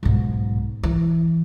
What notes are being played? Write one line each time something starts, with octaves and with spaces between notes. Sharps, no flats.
B1 G#2
E3